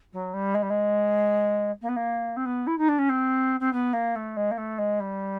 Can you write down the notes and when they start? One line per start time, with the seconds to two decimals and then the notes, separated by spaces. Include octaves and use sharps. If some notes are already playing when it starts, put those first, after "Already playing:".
0.13 F#3
0.33 G3
0.54 G#3
0.62 G3
0.70 G#3
1.81 A#3
1.88 B3
1.96 A#3
2.36 C4
2.45 B3
2.67 E4
2.78 D#4
2.88 D4
2.98 C#4
3.09 C4
3.60 C4
3.72 B3
3.93 A#3
4.15 A3
4.36 G#3
4.51 A#3
4.57 A3
4.78 G#3
5.00 G3